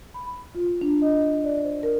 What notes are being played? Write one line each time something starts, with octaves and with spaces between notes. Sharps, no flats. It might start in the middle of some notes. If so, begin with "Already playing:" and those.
B5
B5
F4
D4
D#5
D5
C5
A#4